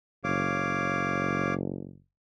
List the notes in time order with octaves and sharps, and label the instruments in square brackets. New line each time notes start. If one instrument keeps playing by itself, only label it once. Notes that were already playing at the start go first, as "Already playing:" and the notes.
[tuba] F#1 [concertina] C#5 F5 D6